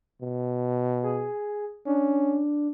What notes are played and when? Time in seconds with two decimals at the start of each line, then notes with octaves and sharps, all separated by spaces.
0.22 B2
1.03 G#4
1.87 C#4 D4